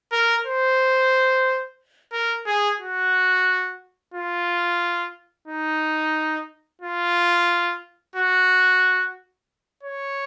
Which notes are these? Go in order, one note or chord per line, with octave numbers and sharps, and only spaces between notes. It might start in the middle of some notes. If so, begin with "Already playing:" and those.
A#4
C5
A#4
G#4
F#4
F4
D#4
F4
F#4
C#5